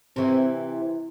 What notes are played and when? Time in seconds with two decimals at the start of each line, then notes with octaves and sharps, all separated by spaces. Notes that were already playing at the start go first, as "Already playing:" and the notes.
0.16 C3 E3 C4
0.62 E4